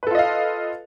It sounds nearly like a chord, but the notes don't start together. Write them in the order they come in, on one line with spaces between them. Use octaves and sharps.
B4 A4 F4 D#5 F5